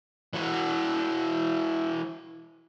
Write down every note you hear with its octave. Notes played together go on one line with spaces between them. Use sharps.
E3 F#4